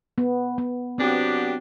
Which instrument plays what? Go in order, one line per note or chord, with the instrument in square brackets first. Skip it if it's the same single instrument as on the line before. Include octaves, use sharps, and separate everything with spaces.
[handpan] B3
B3
[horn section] F#3 B3 D4 G4 [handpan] C4